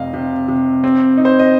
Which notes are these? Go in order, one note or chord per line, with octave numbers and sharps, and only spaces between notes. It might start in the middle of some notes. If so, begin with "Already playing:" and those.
Already playing: F1 C3 D#5 F5
C3
C3
C4
D#4
C5
D#5